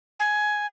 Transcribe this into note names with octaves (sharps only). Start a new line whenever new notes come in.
G#5